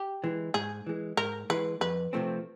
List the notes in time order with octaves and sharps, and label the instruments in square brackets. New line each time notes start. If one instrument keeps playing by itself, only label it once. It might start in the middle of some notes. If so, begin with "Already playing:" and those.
Already playing: [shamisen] G4
[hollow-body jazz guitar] E3 G#3
[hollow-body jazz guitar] G#2 [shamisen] G#4
[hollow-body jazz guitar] E3 G#3
[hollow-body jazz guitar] G#2 [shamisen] A#4
[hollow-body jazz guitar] E3 G#3 [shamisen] B4
[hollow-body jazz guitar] F2 [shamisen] B4
[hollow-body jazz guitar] C3 F3 A3 C4